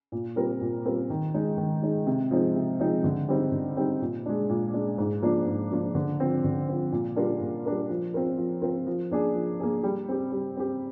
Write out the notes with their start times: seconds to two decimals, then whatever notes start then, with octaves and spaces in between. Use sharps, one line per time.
0.12 A#2
0.36 G3 C4 F4 A#4
0.61 A#2
0.85 G3 C4 F4 A#4
1.10 D#3
1.34 G#3 D#4
1.57 D#3
1.83 G#3 D#4
2.07 C3
2.31 F3 G#3 C4 D#4
2.56 C3
2.80 F3 G#3 C4 D#4
3.04 D3
3.28 G3 C4 D#4
3.52 D3
3.77 G3 C4 D#4
4.01 A#2
4.26 G#3 D4
4.49 A#2
4.74 G#3 D4
4.98 G#2
5.22 F3 A#3 D4 F4
5.47 G#2
5.71 F3 A#3 D4 F4
5.95 D3
6.20 F3 C4
6.44 D3
6.69 F3 C4
6.92 A#2
7.16 G3 D4 F4 A#4
7.41 A#2
7.66 G3 D4 F4 A#4
7.90 F3
8.14 C4 F4 A#4
8.38 F3
8.62 C4 F4 A#4
8.87 F3
9.11 A#3 D4 G#4
9.35 F3
9.60 A#3 D4 G#4
9.83 G3
10.09 C4 G4
10.32 G3
10.57 C4 G4